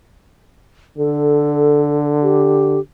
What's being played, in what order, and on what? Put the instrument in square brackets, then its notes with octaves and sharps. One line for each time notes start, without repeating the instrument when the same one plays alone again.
[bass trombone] D3 [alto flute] A4
[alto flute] G4